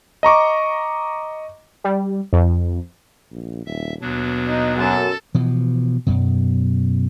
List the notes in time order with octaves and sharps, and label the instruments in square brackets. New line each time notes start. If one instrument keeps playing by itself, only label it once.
[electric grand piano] D#5 A#5 C#6 D6
[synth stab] G3
F2
[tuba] A#1
[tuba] D#1 [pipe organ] E5
[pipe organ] D#2 F#3 D4 [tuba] B2
[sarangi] D#4
[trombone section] F#2 [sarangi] A4
[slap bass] B2 E3 F3
F#2 B2